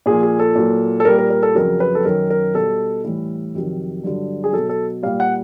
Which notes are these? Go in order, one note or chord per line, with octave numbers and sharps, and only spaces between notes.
A#2 F3 G#4
G#4
A4
A#2 F#3
A4
A#2 G3 A#4
A#4
A#4
A4
F2 C#3 F#3 A#4
B4
A4
F#2 D#3 F#3 A#4
A#4
B2 G3 A4
A2 E3 G3
F2 C3 D#3 F#3
G2 D3 F#3
G#4
B2 F#3 A4
A4
A#2 G3 F5
F#5